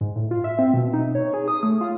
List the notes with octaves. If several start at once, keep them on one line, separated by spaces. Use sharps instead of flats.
G#2
A2
F4
E5
C4
B2
D#4
C#5
G#4
D#6
A3
F4